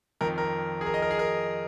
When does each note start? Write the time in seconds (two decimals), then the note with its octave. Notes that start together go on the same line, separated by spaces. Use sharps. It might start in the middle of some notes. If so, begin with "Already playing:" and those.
0.21 F2 D#3 A#4
0.38 A#4
0.81 G#4
0.86 A#4
0.94 D#5
1.02 A#4
1.11 G#4
1.19 A#4